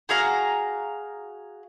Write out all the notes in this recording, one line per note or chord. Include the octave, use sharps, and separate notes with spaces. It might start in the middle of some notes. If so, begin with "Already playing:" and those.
F#4 G#4 F5 A#5